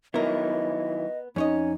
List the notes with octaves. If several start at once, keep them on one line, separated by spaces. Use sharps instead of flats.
D#3 F#3 B3 E4 A#4 D#5
F2 C#4 D#4 C#5 D#5